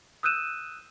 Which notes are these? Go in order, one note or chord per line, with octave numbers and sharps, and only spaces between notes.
D#6 E6 F#6 G6 D#7 E7